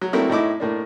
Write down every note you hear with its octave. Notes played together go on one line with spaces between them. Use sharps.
F#3
F#3 A3 A#3 C4 D4 E4
A2 D#4 E4 D6
A2 A#3 D4